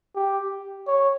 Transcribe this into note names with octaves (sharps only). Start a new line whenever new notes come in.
G4
C#5